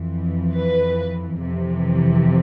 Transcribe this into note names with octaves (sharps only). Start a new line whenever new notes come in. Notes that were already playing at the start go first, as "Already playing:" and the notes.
Already playing: F2 E3
B4
F2 C3 E3